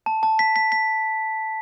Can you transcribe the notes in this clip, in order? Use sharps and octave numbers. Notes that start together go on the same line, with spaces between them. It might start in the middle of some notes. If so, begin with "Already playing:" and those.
A5
A5
B6
B6
B6